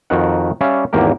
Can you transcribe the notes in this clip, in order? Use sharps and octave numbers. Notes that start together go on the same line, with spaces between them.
F2 D#3 F#4 A#4 F#5
G3 C#4 D5 E5 F5
G#1 E2 A#3 G4 A#4